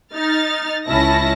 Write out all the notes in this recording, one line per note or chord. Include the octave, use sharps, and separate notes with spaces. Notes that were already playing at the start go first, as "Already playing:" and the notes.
D#4 F6 A6
C#2 C#4 E4 A5 A#6